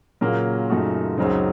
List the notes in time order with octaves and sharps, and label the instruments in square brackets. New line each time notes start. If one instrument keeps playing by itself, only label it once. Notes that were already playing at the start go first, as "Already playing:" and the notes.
[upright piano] A#2 [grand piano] C#3 F#3 A#3
[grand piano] F#2 C#3 A3 D#4 F#4
[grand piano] C#2 C#3 F#3 C4 D#4 [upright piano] F#2